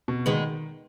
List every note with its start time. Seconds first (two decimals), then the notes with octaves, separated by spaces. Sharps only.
0.08 B2
0.26 D#3 G#3 B3